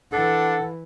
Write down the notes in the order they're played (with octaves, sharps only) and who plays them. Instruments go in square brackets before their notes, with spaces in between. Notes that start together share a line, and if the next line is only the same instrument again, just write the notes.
[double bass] E3 [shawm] D4 [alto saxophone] A4 [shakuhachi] F#5